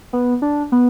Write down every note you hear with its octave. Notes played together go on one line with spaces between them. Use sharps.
B3
D4
B3